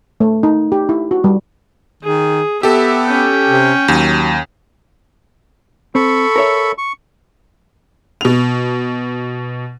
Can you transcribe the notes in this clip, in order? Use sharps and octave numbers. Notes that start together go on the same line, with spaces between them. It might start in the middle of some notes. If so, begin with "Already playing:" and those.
A3
D#4
G4
E4
F#4
G3
D#3 G#4
B3 G4 A4 E5
C#4 G5
C3
D#2 F#3
C4 A4 B5 C#6
A#4 C#5 E5
C#6
B2 F7